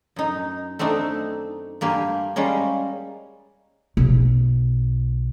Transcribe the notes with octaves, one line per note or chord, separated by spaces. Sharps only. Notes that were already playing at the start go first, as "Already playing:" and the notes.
F#2 D#4
A3 C4 D4 D#4
G2 A#3 G4 G#5
G3 G#3 A#3 C#4
B1